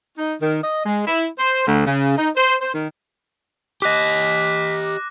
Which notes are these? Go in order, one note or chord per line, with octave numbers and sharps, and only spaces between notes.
D#4
D#3
D#5
G#3
E4
C5
D2
C#3
D#4
C5
C5
D#3
G4 D#5 D6 F#6 A#6 B6